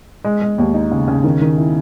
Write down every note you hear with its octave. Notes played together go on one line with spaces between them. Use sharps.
G#3
G#3
D#2
D#4
C#3
C#3
D#3
D#3
E4